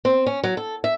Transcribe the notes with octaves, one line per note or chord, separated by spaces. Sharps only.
C4
C#4
F#3
A4
E5